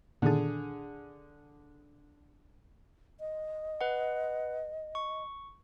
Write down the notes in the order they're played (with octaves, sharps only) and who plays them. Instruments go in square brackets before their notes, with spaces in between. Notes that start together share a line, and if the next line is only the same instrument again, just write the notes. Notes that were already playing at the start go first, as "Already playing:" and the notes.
[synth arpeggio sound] A#2 D#3 A5 [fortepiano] D3 G#4
[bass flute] D#5
[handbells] B4 F#5
C#6